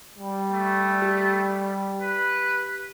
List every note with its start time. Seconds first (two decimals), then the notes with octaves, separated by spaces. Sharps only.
0.18 G3
0.52 A3
1.02 G4
2.02 B4